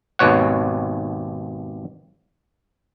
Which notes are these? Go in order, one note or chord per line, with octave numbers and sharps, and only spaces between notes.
G#1 D#2 B2 C#5 F#5